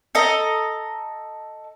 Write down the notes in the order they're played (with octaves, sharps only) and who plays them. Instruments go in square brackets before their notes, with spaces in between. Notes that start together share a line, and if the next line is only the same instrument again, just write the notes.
[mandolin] A4 D#5 A#5